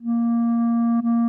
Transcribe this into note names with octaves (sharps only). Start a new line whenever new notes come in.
A#3
A#3